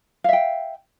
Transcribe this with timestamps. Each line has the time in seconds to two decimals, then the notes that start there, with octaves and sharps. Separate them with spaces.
0.24 F5
0.29 E5
0.33 G5